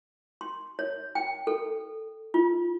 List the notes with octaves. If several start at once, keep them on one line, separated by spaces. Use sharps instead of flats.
C6
C#5
G5
A4
F4